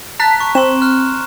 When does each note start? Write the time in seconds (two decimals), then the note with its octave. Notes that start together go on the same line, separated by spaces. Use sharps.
0.20 A5 A#5 F#6 B6
0.40 C#6
0.55 C4 C6 E7
0.82 F6 F#6